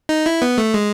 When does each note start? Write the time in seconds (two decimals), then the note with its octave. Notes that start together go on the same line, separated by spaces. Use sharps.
0.09 D#4
0.26 E4
0.42 B3
0.58 A3
0.74 G#3